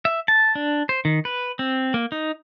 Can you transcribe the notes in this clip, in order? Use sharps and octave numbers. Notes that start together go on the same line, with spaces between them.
E5
A5
D4
C5
D#3
B4
C4
A#3
D#4